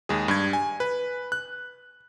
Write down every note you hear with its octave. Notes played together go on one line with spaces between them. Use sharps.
D#2 G#3 G#4
G2 G#6
G#5
B4
F#6